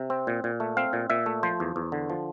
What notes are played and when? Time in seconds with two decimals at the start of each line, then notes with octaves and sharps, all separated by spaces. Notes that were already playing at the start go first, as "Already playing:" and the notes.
Already playing: C3
0.10 C4
0.27 A#2
0.44 A#2
0.60 A3
0.77 C4 F5
0.93 A#2
1.10 A#2 E5
1.26 A3
1.43 F3 C5
1.60 E2
1.76 E2
1.92 D3
2.10 F3